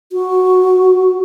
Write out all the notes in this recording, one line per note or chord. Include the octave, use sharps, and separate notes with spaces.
F#4